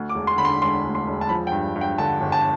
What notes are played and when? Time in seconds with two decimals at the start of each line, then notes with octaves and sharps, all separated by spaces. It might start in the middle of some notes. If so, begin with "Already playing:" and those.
Already playing: D2
0.09 D6
0.15 E1
0.27 C6
0.38 D3 B5
0.45 C6
0.62 E1 C6
0.84 D2
0.95 C6
1.07 E1
1.21 A5
1.29 F3 B5
1.47 G5
1.52 G2
1.76 G2
1.81 G5
1.98 D3 A5
2.21 G1
2.32 A5